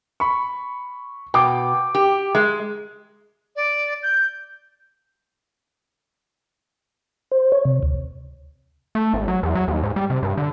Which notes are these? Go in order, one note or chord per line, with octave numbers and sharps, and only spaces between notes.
B5 C#6
B2 G5 D6
G4
G#3
D5
G6
C5
C#5
C3
D2
A3
G#1
F#3
E2
F#3
D#2
G#2
G3
C3
G2
D3